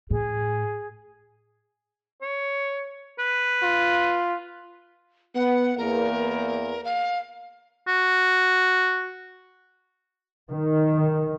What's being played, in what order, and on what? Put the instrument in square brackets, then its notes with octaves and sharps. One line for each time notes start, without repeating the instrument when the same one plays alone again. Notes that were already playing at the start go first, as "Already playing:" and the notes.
[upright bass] A2 [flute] G#4
[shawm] C#5
B4
[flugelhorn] F4
[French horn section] B3 [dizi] F#5
[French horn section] E2 A#3 [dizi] A#4
[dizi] F5
[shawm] F#4
[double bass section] D#3